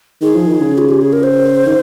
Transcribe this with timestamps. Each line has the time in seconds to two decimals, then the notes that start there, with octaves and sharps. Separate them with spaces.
0.21 D#3 G#4
0.35 F3
0.47 D#3
0.60 C#3
0.78 F4
0.89 G4
1.01 G#4
1.13 A#4
1.23 C5
1.66 D#3